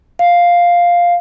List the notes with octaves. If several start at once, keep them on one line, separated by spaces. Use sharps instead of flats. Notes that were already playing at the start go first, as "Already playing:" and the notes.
F5